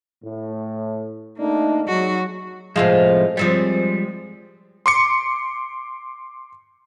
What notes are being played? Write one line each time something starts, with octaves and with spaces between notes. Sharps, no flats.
A2
A3 A#3 D4 D#4
F#3 G#3 D#4 F#4
A2 C3 F3 G#3 F4
F3 G3 G#3 C4 C#5
C6 D6 C#7